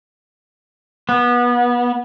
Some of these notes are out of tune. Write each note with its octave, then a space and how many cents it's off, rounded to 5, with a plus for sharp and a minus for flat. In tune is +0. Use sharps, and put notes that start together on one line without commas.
B3 -25